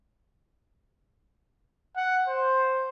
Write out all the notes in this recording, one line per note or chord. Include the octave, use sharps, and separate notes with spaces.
F#5
C5